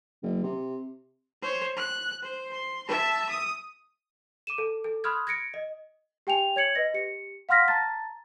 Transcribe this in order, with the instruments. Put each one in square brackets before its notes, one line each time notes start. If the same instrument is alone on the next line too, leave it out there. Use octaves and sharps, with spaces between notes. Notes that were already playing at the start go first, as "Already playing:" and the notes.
[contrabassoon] F#1
C3
[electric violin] C5 C#5
F#6
C5
C6
E5 A5
D#6
[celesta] D6 D#7 E7
A4
A4
B5 C6 D#6 F6 F#6 G#6
G#6 A#6 C#7 D7
D#5
G4 G5 G#5 F7
C#5 G#6 C#7 F#7
B4 D#5 A#6
G4 C#7
F5 F#5 C6 F6 A#6 B6
A5 A#5 A6